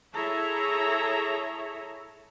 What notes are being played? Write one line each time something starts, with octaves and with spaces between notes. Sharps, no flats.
E4 G#4 A4 C#5 E5 A#5